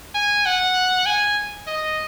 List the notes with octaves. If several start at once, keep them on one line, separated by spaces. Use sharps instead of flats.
G#5
F#5
G#5
D#5